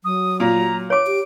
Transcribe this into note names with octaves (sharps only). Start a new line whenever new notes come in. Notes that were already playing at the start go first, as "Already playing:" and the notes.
F#3 D#6
A#2 A#5
C#5 D6 D7
G4